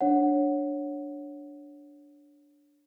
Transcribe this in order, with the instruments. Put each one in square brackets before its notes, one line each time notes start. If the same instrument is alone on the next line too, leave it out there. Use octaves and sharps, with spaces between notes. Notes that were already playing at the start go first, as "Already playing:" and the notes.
[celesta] D4 C#5 F#5